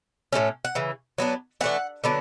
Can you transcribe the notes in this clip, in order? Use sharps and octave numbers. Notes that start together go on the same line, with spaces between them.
A2 F#3 A3 C#4
F#5
C#3 E3
F#3 B3 D4
E3 A3 D4 F#5
D3 F#3 B3 D4